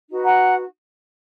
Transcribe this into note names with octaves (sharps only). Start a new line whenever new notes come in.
D#4 F#4 B4
F#5 A#5